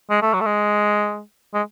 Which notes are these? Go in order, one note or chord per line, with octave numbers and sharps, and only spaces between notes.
G#3
A3
F#3
A3
G#3
G#3